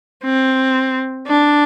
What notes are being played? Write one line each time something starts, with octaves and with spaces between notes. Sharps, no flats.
C4
D4